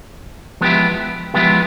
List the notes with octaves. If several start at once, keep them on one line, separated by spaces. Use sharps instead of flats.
F3 G#3 B3 E4 G4
F3 G#3 B3 E4 G4